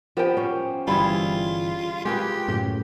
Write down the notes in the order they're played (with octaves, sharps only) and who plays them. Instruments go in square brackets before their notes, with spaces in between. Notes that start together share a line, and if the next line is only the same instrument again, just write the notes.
[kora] F3 B3 G4 [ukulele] A#4 G5
[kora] C#4 C5
[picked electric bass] G1 E3 [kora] G3 E4 G#4 [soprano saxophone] F4 [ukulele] B5
[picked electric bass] G#3 [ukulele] F4 G5 [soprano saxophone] G4 [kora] G#4 A#4 B4
[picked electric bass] F#2 A2 C#3